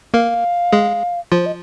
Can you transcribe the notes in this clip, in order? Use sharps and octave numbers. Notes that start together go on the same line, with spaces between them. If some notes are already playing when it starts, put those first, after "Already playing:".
A#3 A#4 F5
G#3 G#4
F3 F4 C5
D#5